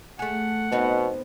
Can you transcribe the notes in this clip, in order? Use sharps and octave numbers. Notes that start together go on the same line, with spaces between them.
A3 G#4 F#5
B2 B3 C4 D#4